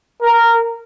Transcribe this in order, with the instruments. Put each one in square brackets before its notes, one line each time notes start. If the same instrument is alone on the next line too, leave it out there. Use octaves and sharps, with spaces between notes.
[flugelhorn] A#4